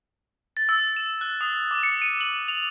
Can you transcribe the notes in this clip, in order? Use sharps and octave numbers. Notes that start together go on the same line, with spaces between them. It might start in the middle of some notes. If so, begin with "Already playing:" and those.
A6
E6
E7
F#6
D#6
D6
C#7
D#7
F#7
F7